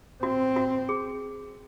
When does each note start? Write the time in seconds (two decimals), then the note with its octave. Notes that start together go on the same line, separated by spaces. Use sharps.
0.23 C4 F#4
0.56 F#4
0.89 G#4